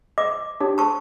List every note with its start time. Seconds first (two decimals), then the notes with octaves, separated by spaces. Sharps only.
0.18 D#5 D6
0.60 D4 G4 C#5
0.78 A5 C#6